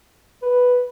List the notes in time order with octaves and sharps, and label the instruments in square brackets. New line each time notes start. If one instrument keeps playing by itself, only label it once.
[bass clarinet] B4